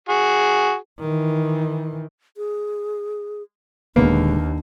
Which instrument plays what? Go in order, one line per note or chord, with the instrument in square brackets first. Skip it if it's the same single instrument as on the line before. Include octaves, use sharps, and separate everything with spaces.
[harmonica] F#4 G#4
[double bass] D#3 E3
[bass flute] G#4
[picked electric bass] D#1 D3 G#3 [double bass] D#2 [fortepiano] A#3 B3 [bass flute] D4